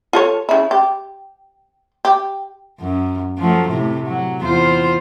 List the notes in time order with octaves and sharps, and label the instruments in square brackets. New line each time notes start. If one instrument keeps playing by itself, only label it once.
[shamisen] F4 A4 C#5
C#3 E4
G4
G4
[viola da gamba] F#2
F3 F#3 A3
A2 C3 A3
F#3
E2 F4 C5